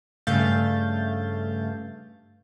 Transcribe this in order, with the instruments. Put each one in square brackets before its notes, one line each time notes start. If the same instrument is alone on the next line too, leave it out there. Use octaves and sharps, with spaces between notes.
[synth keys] G2 C#3 A3 F5 G6 A6